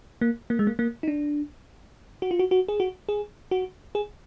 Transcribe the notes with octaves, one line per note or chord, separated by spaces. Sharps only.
A#3
A#3
G#3
A#3
A#3
D#4
D4
F#4
F4
F#4
F#4
G#4
F#4
G#4
F#4
G#4